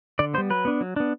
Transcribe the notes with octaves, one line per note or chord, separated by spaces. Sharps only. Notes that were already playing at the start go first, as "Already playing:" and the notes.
D3 D5
G3 B3 C5
F#3 B4
B3 D4
F#3
B3 D4